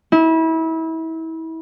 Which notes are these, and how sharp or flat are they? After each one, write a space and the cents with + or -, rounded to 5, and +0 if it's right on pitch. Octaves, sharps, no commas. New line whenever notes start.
E4 -30